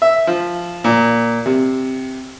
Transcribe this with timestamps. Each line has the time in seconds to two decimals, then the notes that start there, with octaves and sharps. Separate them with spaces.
0.02 E5
0.27 F3
0.84 A#2
1.46 C3